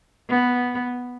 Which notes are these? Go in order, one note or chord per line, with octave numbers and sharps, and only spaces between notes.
B3